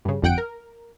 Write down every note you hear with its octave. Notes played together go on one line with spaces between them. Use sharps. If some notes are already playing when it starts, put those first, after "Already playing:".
G2 C#3
G1 F2 F#5 G5 D7
A#4